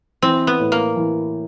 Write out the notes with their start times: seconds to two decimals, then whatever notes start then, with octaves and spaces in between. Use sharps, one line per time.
0.22 E3 C4
0.47 B3
0.59 A2
0.72 A#3
0.96 E3